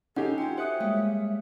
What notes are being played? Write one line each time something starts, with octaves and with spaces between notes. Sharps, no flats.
C#4 D#4 F#4 G4 A4 F#5
F4 G5 G#5
C5 E5 D#6 F#6 C#7
G3 G#3 A#3 C#5 F5 D#6